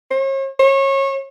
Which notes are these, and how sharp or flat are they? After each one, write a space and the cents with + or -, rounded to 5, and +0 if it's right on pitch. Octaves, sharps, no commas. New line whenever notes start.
C#5 -45
C#5 -25